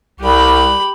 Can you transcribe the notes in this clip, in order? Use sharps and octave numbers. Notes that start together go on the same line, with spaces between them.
C2 G4 B5